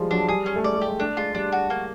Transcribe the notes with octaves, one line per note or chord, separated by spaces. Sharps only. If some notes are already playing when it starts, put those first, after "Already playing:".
Already playing: F3 G3 G#3
F#3 D4
G3 G#4
C#4
A3
G#3 D5
G#3
G4
G#3
A3 D4
G#3 F4
G3 D4
F#4
A#3